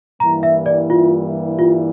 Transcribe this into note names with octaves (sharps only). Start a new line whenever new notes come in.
G2 E3 G3 A#3 E4 A#5
E5
D5
F4
F4